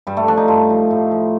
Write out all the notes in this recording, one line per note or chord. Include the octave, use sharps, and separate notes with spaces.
G2 G3
A3
F3 D4
D#4
G2 F4
F3
A2
F3